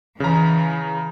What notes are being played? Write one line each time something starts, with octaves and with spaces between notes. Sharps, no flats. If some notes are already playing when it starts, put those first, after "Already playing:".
C#3 E3 A#5